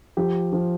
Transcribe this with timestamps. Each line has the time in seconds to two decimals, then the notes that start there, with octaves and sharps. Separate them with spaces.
0.17 F3 G4
0.53 F3